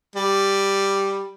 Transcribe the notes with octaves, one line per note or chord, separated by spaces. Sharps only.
G3